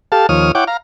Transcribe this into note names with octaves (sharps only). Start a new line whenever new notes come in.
G4 A4 F5 A5
D#2 F3 C#5 D#6 F6
E4 C#5 F#5 G5 D6
F5 A#5